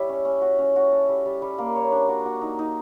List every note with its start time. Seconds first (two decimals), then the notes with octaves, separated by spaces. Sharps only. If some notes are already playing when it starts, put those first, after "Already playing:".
Already playing: G3 E4 C#5 E5
0.09 C#4
0.25 C#4
0.41 F#4
0.59 C#4
0.76 F#4
0.92 A4
1.09 G3
1.25 G3
1.42 G3
1.58 A#3
1.75 C#5
1.92 D4
2.09 F#4
2.25 F#4
2.42 D#4
2.59 D#4